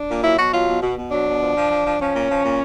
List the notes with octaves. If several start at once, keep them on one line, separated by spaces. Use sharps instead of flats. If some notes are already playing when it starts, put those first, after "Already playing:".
Already playing: D4
A#2
F#3 E4
B2 F#4
F#3 F4
B2
B2
B2
F#3 D4
B2
F3
F3
F3
F3
F3 C#4
A#2
F3
A#2